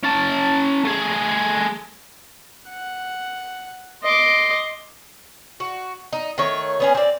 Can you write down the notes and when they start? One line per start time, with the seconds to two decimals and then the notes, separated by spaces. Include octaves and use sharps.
0.03 C#4 A5
0.85 A3 G#4
2.69 F#5
4.03 D#5 C6 D6
5.60 F#4
6.13 D#4
6.38 D#3 A3 C#5
6.80 B3 C#4 G#4
6.95 C4 D5